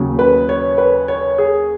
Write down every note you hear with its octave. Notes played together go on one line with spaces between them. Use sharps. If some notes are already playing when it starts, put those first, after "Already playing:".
Already playing: D#2 C#3 F#3
B4
C#5
B4
C#5
G#4